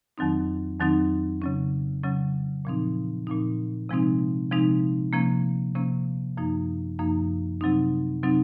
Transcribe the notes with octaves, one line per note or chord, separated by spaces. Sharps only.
F2 D#3 F#3 C4 D#4
F2 D#3 F#3 C4 D#4
C#3 F#3 C#4
C#3 F#3 C#4
A#2 F3 C4 D#4
A#2 F3 C4 D#4
C3 F3 G#3 C4 D#4
C3 F3 G#3 C4 D#4
C3 F3 A#3 C#4
C3 F3 A#3 C#4
F#2 F3 A#3 D#4
F#2 F3 A#3 D#4
C3 F#3 C4 D#4
C3 F#3 C4 D#4